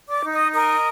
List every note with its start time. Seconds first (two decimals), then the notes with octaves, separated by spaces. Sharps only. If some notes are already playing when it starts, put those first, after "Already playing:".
0.08 D5 D6
0.24 D#4
0.31 D#5 D#6
0.54 A#4 D#5 D#6